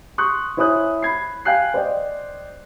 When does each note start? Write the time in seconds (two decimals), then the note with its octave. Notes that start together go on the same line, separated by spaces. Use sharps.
0.18 C6 C#6 D#6 F#6
0.57 E4 C5 C#5 G#5 D#6 F#6
1.03 B5 G#6 C7
1.45 F5 G5 G#5 F#6 C7
1.74 C5 D5 D#5 G5